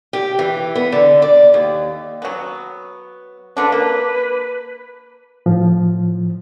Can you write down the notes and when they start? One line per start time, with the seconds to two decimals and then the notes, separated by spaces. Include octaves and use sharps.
0.13 G4
0.39 E3
0.75 B3
0.92 D3
1.22 D5
1.54 D#2
2.22 F#3 B3
3.57 D3 D4 B4
3.72 A#3
5.46 A2 F3